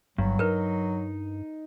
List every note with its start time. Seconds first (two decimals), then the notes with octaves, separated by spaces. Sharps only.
0.18 G1 G2 F#3
0.39 G2 D#4 A#4 B4